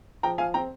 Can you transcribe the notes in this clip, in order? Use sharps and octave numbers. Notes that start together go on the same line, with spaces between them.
F3 G5 A#5
F3 F5 G#5
C4 G5 A#5